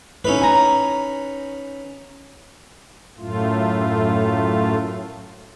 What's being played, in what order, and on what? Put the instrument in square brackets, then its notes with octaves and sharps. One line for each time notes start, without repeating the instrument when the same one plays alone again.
[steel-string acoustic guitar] A2 E4 [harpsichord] C#4 D#4 B4
[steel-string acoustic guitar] G#5 A#5
[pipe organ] F#2 A2 A3 F4